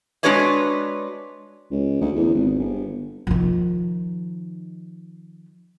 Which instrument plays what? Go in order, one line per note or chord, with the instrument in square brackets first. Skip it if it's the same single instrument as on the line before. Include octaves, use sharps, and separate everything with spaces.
[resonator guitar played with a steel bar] G#3 D4 F#4 B4 C#5 D5
[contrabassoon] C#2
D2
E2
G#1
G1
[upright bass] D#3 F3